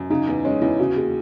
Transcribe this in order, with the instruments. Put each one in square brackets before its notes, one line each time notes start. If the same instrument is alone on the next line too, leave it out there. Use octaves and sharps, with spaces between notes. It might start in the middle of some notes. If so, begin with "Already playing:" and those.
Already playing: [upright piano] F#2
[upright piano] C#3 [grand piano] D#4
[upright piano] E2
[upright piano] G#3 [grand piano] C#4
[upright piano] E2 [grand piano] E4
[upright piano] C#3 [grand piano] F#4
[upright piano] D#2 [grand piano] G#4